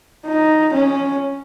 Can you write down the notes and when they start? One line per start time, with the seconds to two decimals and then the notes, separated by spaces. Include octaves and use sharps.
0.27 D#4
0.73 C#4